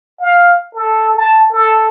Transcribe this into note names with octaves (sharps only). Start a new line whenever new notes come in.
F5
A4
A5
A4